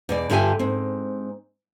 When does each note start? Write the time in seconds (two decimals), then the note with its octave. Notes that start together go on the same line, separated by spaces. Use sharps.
0.09 E2 B2 D5
0.30 G2 D3 F4 G4 E5 G#5
0.59 G#2 C4